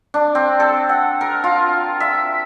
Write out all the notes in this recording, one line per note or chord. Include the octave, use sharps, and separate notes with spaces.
D4
C4
A4
F#5
A#4
F4
E5